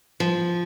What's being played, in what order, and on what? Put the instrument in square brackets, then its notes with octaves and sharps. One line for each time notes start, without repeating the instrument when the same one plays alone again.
[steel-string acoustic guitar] F3